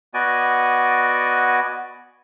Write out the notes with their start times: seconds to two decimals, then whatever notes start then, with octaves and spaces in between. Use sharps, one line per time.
0.14 B3 F#4 D5 D#5 G#5